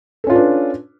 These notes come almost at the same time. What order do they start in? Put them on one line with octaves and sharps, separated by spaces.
A4 C#4 F4 B4 D4